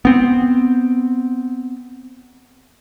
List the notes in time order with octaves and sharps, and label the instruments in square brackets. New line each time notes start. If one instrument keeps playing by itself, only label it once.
[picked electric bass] B3 C4